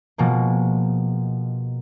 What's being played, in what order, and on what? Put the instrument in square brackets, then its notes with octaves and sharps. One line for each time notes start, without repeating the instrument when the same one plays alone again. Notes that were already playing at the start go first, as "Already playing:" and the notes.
[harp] B2 F3 G#3 A#3